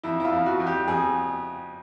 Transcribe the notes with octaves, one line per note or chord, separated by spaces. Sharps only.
F2 E4
E4
F4
F2
F#4
F2
G4
F2 G#4